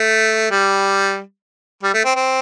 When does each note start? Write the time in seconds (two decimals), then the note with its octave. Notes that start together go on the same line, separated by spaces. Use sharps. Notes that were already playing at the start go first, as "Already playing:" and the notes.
Already playing: A3
0.51 G3
1.83 G3
1.94 A3
2.04 C4
2.16 C4